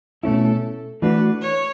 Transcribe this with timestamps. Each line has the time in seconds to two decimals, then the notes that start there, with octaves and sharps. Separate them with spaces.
0.23 B2 A3 C#4 E4 A4
1.02 E3 A3 D4 F#4 B4
1.42 C#5